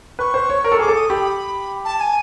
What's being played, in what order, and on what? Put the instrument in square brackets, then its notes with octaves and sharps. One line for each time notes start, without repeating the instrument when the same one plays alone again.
[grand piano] B4 [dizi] C#6
[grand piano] C5
C#5
A#4
A4
[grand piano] G#4 [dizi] D6
[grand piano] A4
[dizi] D#6
[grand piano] G4 [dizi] B5
[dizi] A5
G#5